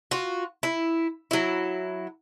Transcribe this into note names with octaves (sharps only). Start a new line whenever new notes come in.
F4 F#4
E4
F#3 E4